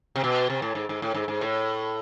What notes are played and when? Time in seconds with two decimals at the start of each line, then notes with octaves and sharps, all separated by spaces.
0.16 C3
0.24 B2
0.50 C3
0.62 A2
0.75 G#2
0.89 G#2
1.02 A2
1.14 G#2
1.28 G#2
1.41 A2